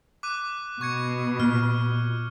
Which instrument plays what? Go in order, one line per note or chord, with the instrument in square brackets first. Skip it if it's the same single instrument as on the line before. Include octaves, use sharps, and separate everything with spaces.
[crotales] D6 F#6 D#7
[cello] B2 [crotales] C#6 G#6 C#7
[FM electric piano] A#2 [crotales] F6